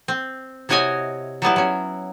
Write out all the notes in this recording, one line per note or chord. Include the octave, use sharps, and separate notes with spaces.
C4
C3 E4 F#4 C#5 D#5 G#5
F#3 G3 B3 E4
F#3 C#4